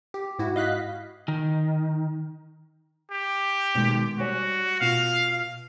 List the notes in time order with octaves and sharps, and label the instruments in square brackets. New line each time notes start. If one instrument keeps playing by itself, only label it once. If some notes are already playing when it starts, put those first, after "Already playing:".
[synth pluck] G4
G#2 E4 F#4
D#5 F5 F#6 B6
[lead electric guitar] D#3
[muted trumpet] G4
[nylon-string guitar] B2 D#3 G#3
[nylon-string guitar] G3 C#5 G#5 [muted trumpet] F#4
[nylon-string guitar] B2 F4 [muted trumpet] F5